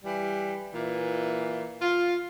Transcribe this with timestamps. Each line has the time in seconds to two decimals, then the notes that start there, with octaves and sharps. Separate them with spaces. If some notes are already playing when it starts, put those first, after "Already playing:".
0.04 E3 G3
0.73 A#2 E3
1.82 F4